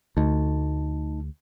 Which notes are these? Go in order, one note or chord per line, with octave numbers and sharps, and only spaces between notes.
D2 A3 D#4 A5